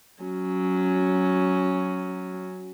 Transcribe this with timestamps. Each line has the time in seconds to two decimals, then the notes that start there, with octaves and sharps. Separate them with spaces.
0.24 F#3 C#4